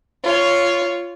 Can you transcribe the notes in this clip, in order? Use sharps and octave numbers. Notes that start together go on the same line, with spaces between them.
F4 C#5